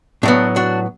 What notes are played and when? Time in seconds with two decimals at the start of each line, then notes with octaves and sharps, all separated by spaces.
0.23 A2 F#3 B3 D4
0.56 D4 F#4